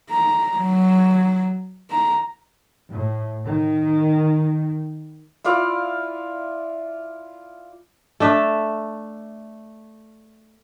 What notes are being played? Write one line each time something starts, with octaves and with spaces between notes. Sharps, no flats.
A#5
F#3
A#5
A2
D#3
E4 F4 D5 F5
A3 D4 E5